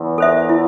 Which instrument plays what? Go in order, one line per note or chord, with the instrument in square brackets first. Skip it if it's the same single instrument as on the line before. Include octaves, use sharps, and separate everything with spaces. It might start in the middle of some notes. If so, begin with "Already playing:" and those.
Already playing: [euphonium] E2
[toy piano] A4 C5 E5
E4